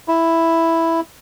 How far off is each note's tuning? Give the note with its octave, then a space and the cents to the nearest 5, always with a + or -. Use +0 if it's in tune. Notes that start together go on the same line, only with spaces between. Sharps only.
E4 +0